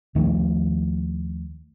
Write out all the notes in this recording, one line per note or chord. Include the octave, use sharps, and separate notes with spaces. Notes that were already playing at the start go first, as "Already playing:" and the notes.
D#2 D#3 F3 A3